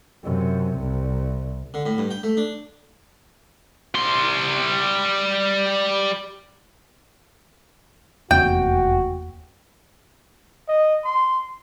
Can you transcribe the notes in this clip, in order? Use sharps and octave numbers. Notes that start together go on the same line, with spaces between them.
F#2 C3
C2
D3
A2
G2
G5
A3
D4
G3 C6
F1 E2 A#3 C#4 F#4 G5
D#5
C6